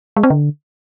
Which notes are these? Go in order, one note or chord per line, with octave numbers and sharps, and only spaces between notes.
G#3
C4
D3